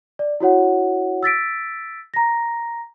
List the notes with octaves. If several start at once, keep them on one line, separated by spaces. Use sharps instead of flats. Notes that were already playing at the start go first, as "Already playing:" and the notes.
D5
E4 F#4 C#5 F#5
E6 A6 B6 D7
A#5 A#6